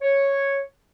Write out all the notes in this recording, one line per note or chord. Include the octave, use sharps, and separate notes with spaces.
C#5